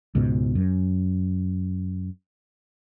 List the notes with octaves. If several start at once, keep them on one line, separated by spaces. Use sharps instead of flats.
C#2 G#2 B2
F#2